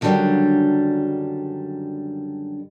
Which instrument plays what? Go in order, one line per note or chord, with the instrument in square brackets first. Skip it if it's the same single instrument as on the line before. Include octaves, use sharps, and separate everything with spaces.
[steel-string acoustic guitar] F#2 D3 D#3 F#3 G3 D4